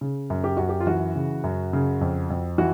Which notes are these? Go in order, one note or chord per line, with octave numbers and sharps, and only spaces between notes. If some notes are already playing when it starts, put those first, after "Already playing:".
C#3
F#2
G4
F#2 F#4
G4
F4
E3 F#4
C#3
F#2
C#3
F2
F2
E3 F#4